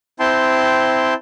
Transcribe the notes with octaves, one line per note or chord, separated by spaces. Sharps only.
C4 E4 G5 A5 C6